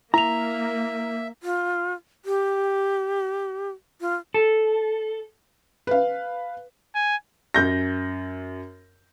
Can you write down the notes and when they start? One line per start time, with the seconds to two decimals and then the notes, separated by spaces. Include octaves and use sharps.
0.14 A#3 E4 E5 A#5 F7
1.42 F4
2.25 G4
4.01 F4
4.34 A4
5.87 B4 F5
6.95 G#5
7.54 F#2 G6 A#6